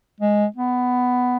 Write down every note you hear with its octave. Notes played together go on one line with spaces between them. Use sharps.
G#3
B3